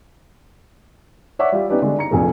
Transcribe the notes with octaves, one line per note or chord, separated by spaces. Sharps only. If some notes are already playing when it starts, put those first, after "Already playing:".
C#5 D5 E5 F#5 C#6 D6
G3 F4 G4
B3 C#4 D#4 G4 B4 D5
D3 G3 G#3
A#5 C#7
F1 A#1 F2 G#4